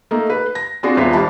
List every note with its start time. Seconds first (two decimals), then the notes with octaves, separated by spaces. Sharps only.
0.11 A3 A#3 D#4
0.30 B4
0.55 A#6
0.83 C4 D4 F4 F#4 G#4
0.97 D#1 B3 F4 E5 B6
1.12 G#1 G3 A5 B5